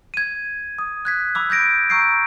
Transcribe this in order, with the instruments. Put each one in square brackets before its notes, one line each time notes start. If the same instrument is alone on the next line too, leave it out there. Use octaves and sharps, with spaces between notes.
[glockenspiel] G#6 D#7
D#6
F#6 G#6 B6
B5 D6 E6
G6 G#6 A#6 D7
A#5 C#6 E6 G6 C7 D7